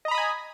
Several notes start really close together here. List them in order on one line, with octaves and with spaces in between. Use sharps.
D#5 A#5 B5 D#6 G#5